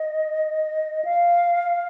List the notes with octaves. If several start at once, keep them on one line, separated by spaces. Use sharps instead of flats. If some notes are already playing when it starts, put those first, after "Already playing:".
Already playing: D#5
F5